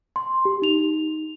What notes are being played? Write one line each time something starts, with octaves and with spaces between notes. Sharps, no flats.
C6
G4
D#4 F7